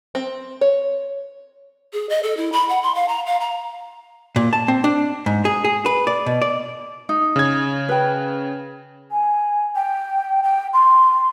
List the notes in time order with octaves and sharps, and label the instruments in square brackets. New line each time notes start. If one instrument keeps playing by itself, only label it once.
[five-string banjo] C4
C#5
[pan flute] G#4
D#5
A4
E4
B5
F#5
C6
F5
A#5
F5
A#5
[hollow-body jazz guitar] A#2
A5
C4
D4
G#2
G#4
G#4
B4
D5
B2
D5
[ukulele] D#4
[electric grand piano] C#3 G#6
[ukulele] B4 G5
[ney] G#5
G5
G5
C6